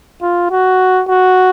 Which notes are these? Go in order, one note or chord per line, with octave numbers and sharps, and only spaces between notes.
F4
F#4
F#4